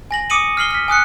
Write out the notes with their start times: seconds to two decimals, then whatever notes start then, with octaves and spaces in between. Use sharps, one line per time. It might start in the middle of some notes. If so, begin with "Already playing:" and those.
0.11 G#5 A#6 F#7
0.30 D6 D#6 C#7 D#7 F#7
0.57 F6 C7 F#7 G7
0.71 F6 B6
0.88 G#5 D#6 F#6 C#7